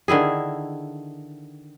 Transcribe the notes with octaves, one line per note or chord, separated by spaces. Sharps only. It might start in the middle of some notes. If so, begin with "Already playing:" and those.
D3 D#3 E4 G#4